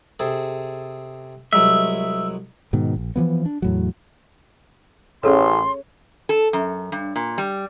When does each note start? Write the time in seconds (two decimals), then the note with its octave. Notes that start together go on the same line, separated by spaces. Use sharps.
0.20 C3 G#4 A4
1.53 C2 F#3 G#3 E5
2.73 G#2 B2 D#3
2.96 A#1
3.16 E3 F3 B3
3.46 D4
3.62 E2 A2 F#3
5.23 A1 C#4 G#4 A4 C#5 C6
6.29 A4
6.53 F#2
6.92 G2
7.16 A#2
7.38 G3